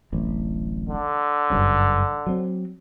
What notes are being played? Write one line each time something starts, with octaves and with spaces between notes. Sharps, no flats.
D1 A1
D3
F#1 G2 C#4
F#3 C4